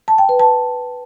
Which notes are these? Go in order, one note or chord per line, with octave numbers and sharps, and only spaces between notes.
A5
G5
B4
A5